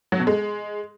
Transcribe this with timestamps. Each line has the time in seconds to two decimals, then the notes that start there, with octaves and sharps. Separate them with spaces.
0.12 F#3
0.20 B2
0.27 G#3